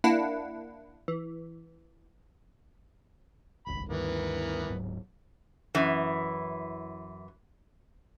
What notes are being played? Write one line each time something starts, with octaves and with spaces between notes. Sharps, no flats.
A#3 D4 E4 F#5
E3
D#1 G#1 C#2 B5
D2 G2 D#3 E3 B3 A#4
D1 G#2 F#3
F#2 E3